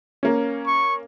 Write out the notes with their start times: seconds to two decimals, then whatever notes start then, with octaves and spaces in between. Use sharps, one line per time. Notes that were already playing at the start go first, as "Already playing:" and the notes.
0.23 A#3 C#4
0.67 C#6